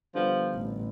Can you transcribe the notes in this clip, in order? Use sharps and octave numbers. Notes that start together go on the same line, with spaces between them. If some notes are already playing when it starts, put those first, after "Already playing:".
D3 F3 G3 B3
A1